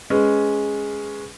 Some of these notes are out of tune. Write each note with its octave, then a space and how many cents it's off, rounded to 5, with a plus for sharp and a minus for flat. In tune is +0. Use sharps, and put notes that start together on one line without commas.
G#3 +0 C#4 +0 B4 +0